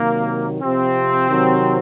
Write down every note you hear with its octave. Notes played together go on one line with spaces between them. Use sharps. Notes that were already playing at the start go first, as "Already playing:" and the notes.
Already playing: C3 D#3 F#3 A#3
C3 F3 C4
C3 D#3 F#3